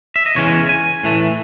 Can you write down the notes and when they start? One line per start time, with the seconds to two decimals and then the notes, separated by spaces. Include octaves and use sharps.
0.16 E5
0.26 D#5
0.35 E2 C#3 E3 G#3 C#4 C#5
0.69 G#5
1.03 A2 E3 A3